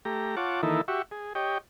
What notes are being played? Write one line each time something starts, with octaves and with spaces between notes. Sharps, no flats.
A3 G4 A#5
F4 C#5 F#5 A5 D6
D#3 E3 A#3 D#4 E4 A4
F#4 G4 E5 C#6
G#4
G4 C#5 D#5 G5